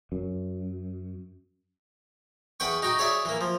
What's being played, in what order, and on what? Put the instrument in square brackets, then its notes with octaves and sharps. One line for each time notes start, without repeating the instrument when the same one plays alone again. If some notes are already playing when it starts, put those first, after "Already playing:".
[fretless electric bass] F#2
[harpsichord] E2 B4 F#5 G5 C#6
D#4 F#4 G5
G#4 C#5 D5 E5
E3 A#3
F3